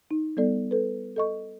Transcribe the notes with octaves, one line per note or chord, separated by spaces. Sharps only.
D#4
G3 B3 A4 D5
A4 B4
A4 D#5 C#6